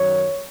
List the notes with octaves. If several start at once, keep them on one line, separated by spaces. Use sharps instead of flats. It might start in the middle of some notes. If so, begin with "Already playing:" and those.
Already playing: F#2 D#3 F#3 C#5